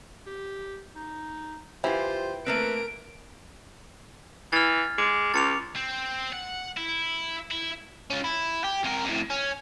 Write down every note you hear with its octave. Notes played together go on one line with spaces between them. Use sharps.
G4
D#4
E3 F4 G4 C5
A3 A#3 C4 A#4 B4 D7
E3 F6 A6
G#3 D6
C#2 A6 C#7 F7
C4
F#5
E4
E4
C#4 F4
E4
G4
C3 A#4
F2 A2
C#4